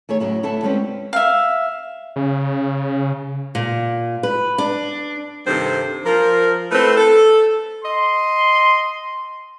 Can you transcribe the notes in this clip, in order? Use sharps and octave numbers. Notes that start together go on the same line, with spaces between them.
D#3 A3 G#4 C#5
A2 C#3 F#3 E4
D2 E4 A4 E5 F#5 A5
G3 G#3 C4 C#4 B4
E5 F5
C#3
A#2
B4
D4
G2 C3 D#3 A4 C5
F3 A#4
A3 C4 E4 A4 B4
A4
D#5 C6